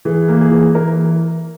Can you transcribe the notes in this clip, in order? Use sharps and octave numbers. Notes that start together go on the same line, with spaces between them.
E3 G#4
A#3
G#4
E3
E3 A#4